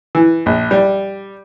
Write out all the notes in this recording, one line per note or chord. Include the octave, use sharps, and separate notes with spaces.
E3
A#1
G3